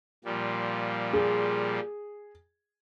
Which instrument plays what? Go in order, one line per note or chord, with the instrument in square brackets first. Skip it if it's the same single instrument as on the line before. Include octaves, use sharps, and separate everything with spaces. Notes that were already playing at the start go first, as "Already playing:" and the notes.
[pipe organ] A#2 F3 G3
[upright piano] G#4